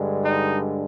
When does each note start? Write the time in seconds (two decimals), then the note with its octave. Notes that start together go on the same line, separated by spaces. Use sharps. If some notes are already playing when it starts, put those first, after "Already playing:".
Already playing: G2 D3 G#3
0.25 D#4